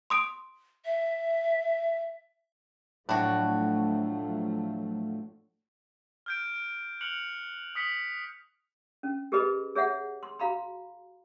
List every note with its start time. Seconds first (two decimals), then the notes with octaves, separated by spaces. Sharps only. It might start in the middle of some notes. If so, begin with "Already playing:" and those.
0.10 C6 D#6 D7
0.85 E5
3.09 A2 F3 F#3 A3 D4 F#4
6.26 F6 G6 D7
6.55 D7
7.01 F6 F#6 C#7 F7 F#7
7.75 D#6 B6 C#7 F#7
9.03 C#4
9.32 G4 G#4 A#4 B4 D#5 B5
9.75 G#4 C#5 E5 F#5
10.23 C6
10.39 F#4 F5 A#5 B5